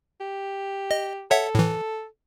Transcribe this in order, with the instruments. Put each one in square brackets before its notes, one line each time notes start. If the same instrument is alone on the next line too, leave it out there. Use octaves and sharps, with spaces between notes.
[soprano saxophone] G4
[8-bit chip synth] D#5
[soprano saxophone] A4 [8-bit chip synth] C#5 E5 F#5
[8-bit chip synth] A2 E3